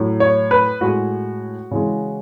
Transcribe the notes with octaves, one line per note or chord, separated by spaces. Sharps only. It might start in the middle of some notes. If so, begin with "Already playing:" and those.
Already playing: A2 F#3
C#5
B4
A2 G#3 F#4
C#3 E3 G#3